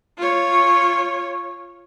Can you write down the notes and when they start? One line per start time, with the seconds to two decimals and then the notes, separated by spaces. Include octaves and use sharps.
0.18 F4 C#5